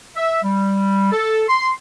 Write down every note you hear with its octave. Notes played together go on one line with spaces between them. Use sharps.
E5
G3
A4
C6